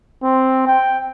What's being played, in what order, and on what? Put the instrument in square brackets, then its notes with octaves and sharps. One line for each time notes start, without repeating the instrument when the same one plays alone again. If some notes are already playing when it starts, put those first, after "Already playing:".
[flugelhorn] C4
G5